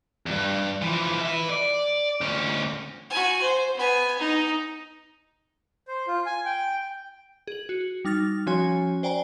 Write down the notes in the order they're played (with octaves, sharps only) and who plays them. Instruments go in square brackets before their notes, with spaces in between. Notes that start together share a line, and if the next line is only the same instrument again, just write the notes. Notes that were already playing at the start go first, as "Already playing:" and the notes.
[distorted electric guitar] E2 G2
E3 F3
B4 E5
D5
D2 C#4
[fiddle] F#4 G#5
C5
B3 G#5
D#4
[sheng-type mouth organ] C5
F4
G#5
G5
[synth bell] G#4 F#7
F#4
G3 D#4 F6 A6 A#6
F3 C#4 F#4 C#5 G#5
C5 D5 G5 G#5 A#5